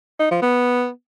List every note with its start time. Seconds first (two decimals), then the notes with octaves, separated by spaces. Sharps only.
0.20 D#4
0.31 F3
0.42 B3